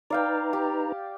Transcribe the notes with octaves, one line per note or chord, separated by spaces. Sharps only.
D#4 B4 D5 F5 G5 A#5
G4